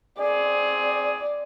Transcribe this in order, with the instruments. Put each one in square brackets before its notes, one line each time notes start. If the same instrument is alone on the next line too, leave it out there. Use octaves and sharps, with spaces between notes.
[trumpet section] C4 G#4 [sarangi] D5